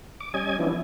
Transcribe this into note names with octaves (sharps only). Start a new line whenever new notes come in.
D6
G3 C#4 D#5 G#5 G#6
E3 F3 B3 C#4 D4 E4